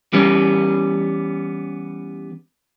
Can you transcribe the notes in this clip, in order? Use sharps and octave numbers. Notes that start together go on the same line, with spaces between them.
E3 G3 B3 C#4